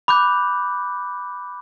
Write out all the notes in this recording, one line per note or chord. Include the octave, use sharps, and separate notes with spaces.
B5 D6 F#6 G6